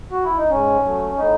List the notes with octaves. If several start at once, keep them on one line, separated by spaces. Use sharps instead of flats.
F#4
E4
D#4
G#2 C#4
F#3 A3
A2 D#4